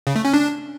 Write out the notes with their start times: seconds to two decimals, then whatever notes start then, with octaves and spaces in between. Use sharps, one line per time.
0.07 C#3
0.16 A3
0.25 C#4
0.33 D4